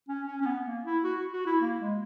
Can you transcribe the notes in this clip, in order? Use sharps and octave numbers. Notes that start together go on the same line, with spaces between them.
C#4
C#4
C#4
B3
A#3
E4
F#4
F#4
E4
A#3
G#3